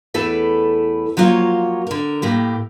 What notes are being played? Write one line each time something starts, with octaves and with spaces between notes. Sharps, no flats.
E2 A3 E4 A4 B4 D5
F3 F#3 A#3 F4 C#5
D3 A#4
A2 A#3 G4